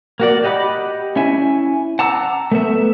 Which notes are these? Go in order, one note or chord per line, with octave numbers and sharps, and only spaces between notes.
A#3 F#4 D5
G4 D#5 F#5 B5 D6
C#4 E4 E5 G#5
F#5 A5 A#5 D6 E6
A3 B3 E5